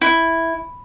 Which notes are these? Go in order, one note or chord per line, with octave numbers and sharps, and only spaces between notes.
E4